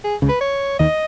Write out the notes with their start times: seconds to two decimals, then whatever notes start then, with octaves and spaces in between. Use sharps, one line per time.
0.04 G#4
0.22 C#2 C#3
0.29 B4
0.41 C#5
0.79 D#2 D#3 D#5